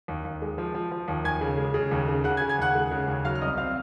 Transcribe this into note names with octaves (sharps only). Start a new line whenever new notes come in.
D#2
D#2
G#3
F3
F3
F3
D#2
D#2 G#5 G#6
C#3
G#3
C#3
D#2
C#3
C#3 F#5 F#6
G#5 G#6
C#3
G#5 G#6
D#2 F#5 F#6
G#3
C#3
D#2
F#3 F5 F6
F6
C2 D#5 D#6
C4 F5 F6